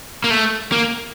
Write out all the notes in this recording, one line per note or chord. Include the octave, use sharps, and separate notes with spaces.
A#3
A3
A#3